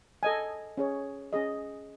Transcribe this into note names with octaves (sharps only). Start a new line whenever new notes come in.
A4 D#5 G#5
C#4 G#4 C#5
C#4 G#4 D#5